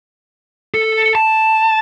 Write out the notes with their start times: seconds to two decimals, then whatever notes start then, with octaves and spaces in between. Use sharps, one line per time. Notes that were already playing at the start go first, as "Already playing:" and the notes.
0.74 A4
1.15 A5